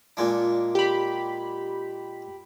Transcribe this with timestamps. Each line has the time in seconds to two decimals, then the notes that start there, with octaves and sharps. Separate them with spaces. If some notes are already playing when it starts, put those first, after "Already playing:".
0.17 A#2 G#3 D4
0.75 G4 B5